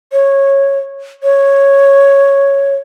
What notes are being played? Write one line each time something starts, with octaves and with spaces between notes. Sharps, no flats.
C#5
C#5